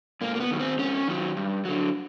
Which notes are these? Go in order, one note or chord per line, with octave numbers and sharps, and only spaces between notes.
G#2 A#3
A#3
B3
D#3 F#3
C4
G#2 C#4
D#3 F#3
G2
D3 F#3